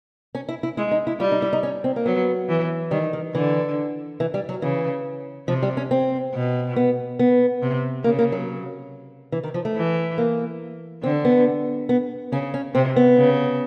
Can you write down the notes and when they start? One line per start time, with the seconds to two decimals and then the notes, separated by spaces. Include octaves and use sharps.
0.35 C#4
0.49 E4
0.63 E4
0.77 G#3 E4
0.91 D#4
1.07 E4
1.20 G3 F4
1.32 D#4
1.42 E4
1.53 D#4
1.63 C#4
1.84 C4
1.96 A#3
2.05 F#3 B3
2.49 E3
2.91 D#3 G3
3.13 D#3
3.34 D3 E3
4.20 E3
4.34 G3
4.49 F#3
4.62 C#3 E3
5.48 C3 F3
5.62 G3
5.77 C#4
5.91 C4
6.33 B2
6.76 B3
7.19 B3
7.62 C3
8.04 C#3 A#3
8.19 A#3
8.32 F#3
9.32 E3
9.43 D#3
9.54 F3
9.65 A3
9.76 E3
10.18 A#3
11.03 D3 C4
11.25 B3
11.89 B3
12.32 C#3 C#4
12.54 C#4
12.74 C3 C4
12.96 B3
13.17 C#3